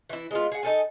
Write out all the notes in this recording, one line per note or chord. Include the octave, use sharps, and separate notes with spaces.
E3 E4
G#3 B3 F4
G#4 F#5
D#4 A4 G#5